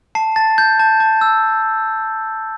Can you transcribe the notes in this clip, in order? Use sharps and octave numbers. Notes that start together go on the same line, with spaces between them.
A5 C7
A5 A6
G6
A5
A5
E6